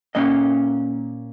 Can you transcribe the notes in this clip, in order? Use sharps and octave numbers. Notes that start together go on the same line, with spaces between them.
A#2 A#3 C#4 D#5